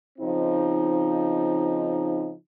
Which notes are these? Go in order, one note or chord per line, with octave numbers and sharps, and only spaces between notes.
C#3 F3 C4 D#4